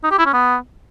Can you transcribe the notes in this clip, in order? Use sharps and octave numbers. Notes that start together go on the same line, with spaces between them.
D#4
G4
E4
C#4
B3